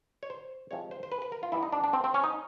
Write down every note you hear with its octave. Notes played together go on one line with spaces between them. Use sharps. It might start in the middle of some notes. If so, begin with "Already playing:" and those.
C#5
C5
C3 F3 G#3 C4 C#5
C5
C5
B4
B4
A#4
F4
E3 G3 B3 E4
D#4
D4
D4
C4
C4
C#4
D#4